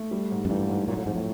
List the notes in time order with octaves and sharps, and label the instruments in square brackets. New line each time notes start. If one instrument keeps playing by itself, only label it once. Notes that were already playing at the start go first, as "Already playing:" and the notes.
Already playing: [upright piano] A3
G3
G#2
[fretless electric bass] F#2
[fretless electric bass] G2 [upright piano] E3
[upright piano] G#2
[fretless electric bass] A#2 [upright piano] F#3
[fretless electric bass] A2
[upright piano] F2 [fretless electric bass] G#2
[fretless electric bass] A2